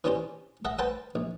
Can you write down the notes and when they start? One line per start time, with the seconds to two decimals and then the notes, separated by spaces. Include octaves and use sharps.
0.04 E3 C#4 D4 G4 C5
0.65 A4 D#5 E5 F#5
0.79 A4 B4 C5 F#5 G5 A5
1.15 A#1